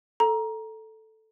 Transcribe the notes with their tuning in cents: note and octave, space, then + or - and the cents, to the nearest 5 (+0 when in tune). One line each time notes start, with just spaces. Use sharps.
A4 +0 A#5 +15